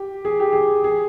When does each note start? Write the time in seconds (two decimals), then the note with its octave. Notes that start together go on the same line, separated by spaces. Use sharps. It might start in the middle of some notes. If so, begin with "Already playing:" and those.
Already playing: G4
0.25 G#4
0.40 G4
0.53 G#4
0.84 G#4